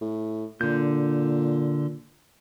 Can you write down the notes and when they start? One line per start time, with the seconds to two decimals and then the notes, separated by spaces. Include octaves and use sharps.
0.01 A2
0.61 A#2 D3 G6